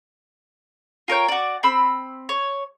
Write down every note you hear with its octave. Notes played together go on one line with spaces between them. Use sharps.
F4 A#4 C#5 G5
F#4 D5
C4 B5 E6
C#5